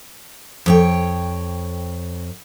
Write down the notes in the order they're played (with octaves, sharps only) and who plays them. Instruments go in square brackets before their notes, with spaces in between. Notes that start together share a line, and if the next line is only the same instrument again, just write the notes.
[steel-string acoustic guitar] F2 C#5 G5